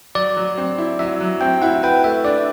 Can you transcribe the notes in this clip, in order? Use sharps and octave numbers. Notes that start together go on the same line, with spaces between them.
F#3 D5
F#3
C4
E4
F#3 E5
F#3
C4 G5
E4 F#5
B4 G5
A3 E5
D4 D5